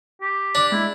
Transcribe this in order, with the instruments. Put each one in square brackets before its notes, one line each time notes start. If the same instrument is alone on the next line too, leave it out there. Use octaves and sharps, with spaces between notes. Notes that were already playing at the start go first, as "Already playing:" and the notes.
[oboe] G4
[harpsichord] D4 [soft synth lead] D6
[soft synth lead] G#3 [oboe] E4